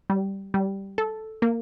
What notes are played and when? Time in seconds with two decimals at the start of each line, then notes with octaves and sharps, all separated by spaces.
0.10 G3
0.54 G3
0.98 A4
1.42 A#3